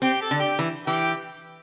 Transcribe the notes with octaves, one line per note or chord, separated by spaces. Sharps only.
C4 G4 G5
A4 A5
D3
G4 G5
E3
E3 G4 G5